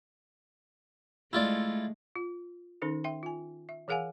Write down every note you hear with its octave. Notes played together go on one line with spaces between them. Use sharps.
G#3 A3 E4 F4 D5
F4
D#3 C#4 D#4 A4 A#4
E5 G5 C6
F4 G#5
E5
E3 G#4 A#4 F5 F#5 G#5